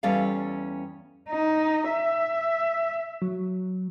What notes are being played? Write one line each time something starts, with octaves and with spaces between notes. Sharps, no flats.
E2 G3 C#4 A4 D5 F5
D#4
E5
F#3